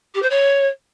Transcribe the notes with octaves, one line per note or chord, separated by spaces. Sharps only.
G4
C5
C#5